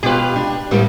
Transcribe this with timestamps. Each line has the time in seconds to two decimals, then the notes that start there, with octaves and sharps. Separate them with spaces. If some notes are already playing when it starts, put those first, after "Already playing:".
0.03 B2 F4 G4 B4
0.36 D4
0.71 D2 A2 G3 A#3